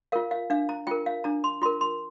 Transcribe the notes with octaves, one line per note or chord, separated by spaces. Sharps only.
F4 A#4 F5
F5
D4 F5
A#5
F4 A#4 G5
F5
D4 A#5
C6
F4 A#4 C6
C6